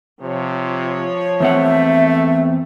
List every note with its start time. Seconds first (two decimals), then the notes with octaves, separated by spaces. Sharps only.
0.21 C3 F3 C#5
1.40 E2 A3 C4 E5 F#5